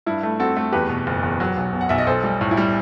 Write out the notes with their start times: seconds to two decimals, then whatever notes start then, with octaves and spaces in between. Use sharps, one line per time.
0.07 G2 E4
0.23 A3
0.39 C4 F#4 A4
0.57 A3
0.72 E2 G4 B4
0.89 B2
1.07 F#1
1.23 E2
1.40 F#3
1.57 B1
1.73 B2
1.81 F#5
1.89 B1 E5
1.98 D#5
2.07 B1 A4 C5
2.24 G3
2.41 A2
2.51 E4
2.57 G3